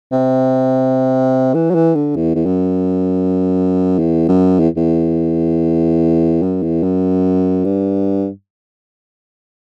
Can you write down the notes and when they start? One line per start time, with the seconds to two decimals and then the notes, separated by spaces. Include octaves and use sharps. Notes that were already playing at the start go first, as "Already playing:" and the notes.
0.12 C3
1.55 E3
1.71 F#3
1.75 E3
1.95 D3
2.16 E2
2.35 E2
2.46 F#2
3.99 E2
4.29 F#2
4.60 E2
4.77 E2
6.43 F#2
6.63 E2
6.83 F#2
7.65 G2